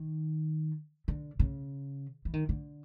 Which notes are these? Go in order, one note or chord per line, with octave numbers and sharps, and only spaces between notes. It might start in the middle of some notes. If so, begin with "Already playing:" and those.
Already playing: D#3
D3
C#3
E3
D#3
D3